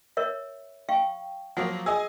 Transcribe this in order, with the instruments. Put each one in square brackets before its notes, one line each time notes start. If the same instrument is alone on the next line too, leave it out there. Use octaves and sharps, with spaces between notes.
[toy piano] A#4 C#5 E5
F5 G5 C#6
[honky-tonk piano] F3 F#3 A#3 [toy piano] F#5
[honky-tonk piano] G#4 D#5 G#5 [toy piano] E6